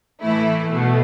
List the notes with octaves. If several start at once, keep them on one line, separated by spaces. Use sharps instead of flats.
A2 E3 A3 E4
B2 A3